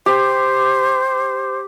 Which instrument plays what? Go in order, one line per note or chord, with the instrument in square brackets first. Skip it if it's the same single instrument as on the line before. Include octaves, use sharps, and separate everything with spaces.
[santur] G4 [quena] C5